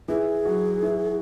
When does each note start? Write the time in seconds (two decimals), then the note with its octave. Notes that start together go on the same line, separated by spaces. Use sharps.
0.08 E3 E4 G#4
0.45 F#3 F#4
0.82 E3 E4